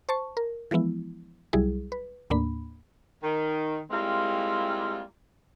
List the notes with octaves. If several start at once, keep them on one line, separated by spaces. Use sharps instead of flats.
C5 A5 C#6
A#4
E3 F3 G#3 B3 E4
C2 F#3 G3 E4 G#4
B4
D#2 A2 A#3 D4 B5
D#3
G3 G#3 A#3 C4 E4 F4